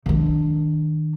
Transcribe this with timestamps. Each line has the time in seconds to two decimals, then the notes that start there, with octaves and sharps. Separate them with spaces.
0.06 D#3 D4